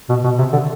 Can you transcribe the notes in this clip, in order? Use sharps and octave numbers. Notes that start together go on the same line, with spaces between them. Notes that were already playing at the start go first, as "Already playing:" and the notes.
B2
B2
C3
D3